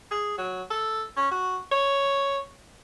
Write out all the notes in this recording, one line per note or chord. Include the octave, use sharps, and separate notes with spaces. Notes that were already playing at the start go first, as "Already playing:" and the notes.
G#4
F#3
A4
C#4
F#4
C#5